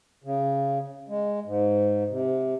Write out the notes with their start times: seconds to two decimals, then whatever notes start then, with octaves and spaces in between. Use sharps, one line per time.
0.24 C#3
1.09 G#3
1.45 G#2
2.09 C3